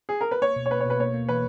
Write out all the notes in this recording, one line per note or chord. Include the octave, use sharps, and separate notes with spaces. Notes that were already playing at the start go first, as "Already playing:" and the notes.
G#4
A#4
B4
A#3 C#5
B2
C#5
A#3 B4
C#5
B2 B4
A#3 C#5
A#3
E3 B4